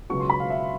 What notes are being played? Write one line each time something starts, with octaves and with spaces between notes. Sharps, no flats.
C#2 B2 F#3 C#6
C6
B5
F5
E5